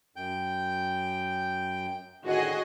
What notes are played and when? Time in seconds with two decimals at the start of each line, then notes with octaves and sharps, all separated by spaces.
0.16 F#2 G5 G6
2.25 A2 D3 D#3 F#4 G#4 D#5